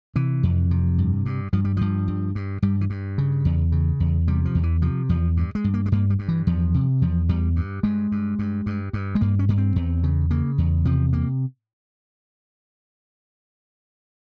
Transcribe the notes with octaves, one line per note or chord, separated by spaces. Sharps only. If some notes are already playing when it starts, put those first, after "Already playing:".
C3 E3
F2
C3
G2
G2
G2 F3
G3
G2 F3
G2
G2
G2 G3
E3
G2
C#3
E2
C#3
E2
C3 G3
F3
E2
E3
C3 F3
E2 F3
G2
G#3
G2
A#3
G#3
G2 A#3
G3
G2
E3
E2 F3
C3
E2 F3
E2 G3
G2
G2 G#3
G2
G2
G2
G2
G#3
G2 A#3
C#4
G2 A#3
C4
E2
C#3
C#3 A#3
E2
C3 F3
C3 A#3